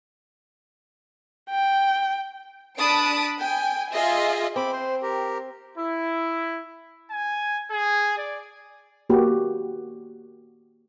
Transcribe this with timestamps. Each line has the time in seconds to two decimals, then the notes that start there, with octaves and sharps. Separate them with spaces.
1.50 G5
2.77 D4 A5 B5 D#6 D7
3.39 G5 G#5
3.92 F4 G#4 D#5 E5
4.56 C4 B5 D6
4.72 C5
5.02 G4 A#4
5.77 E4
7.11 G#5
7.71 G#4
8.18 D5
9.10 A#3 F#4 G4